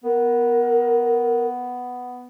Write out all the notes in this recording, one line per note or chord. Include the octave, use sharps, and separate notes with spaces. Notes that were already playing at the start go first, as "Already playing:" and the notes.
B3 A#4